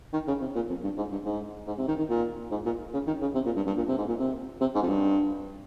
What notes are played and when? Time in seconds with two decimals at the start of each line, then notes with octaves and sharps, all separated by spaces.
0.13 D#3
0.27 C#3
0.41 C3
0.55 A#2
0.69 F2
0.84 G2
0.97 G#2
1.12 G2
1.25 G#2
1.67 G#2
1.78 C3
1.88 D#3
1.98 D#3
2.09 A#2
2.51 G#2
2.65 A#2
2.93 C#3
3.07 D#3
3.21 C#3
3.35 C3
3.45 A#2
3.56 G2
3.67 G2
3.77 A#2
3.88 C3
3.98 G#2
4.08 A#2
4.19 C3
4.61 C3
4.75 G#2
4.82 F2
4.89 G2